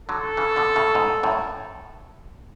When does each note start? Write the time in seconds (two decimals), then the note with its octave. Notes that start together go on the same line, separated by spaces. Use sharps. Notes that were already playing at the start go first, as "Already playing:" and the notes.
0.09 D3 F#3 A4
0.37 C#3 E3
0.56 B2 D3
0.76 A2 C#3
0.95 G#2 B2
1.23 F#2 A2